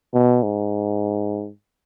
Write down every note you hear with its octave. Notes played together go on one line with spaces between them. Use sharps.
B2
G#2